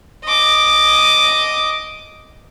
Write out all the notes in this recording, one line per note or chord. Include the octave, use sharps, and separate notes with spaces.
D#5 D6